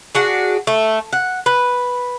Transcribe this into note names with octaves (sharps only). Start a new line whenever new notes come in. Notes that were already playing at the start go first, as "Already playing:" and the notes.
D4 F#4 G#4
A3
F#5
B4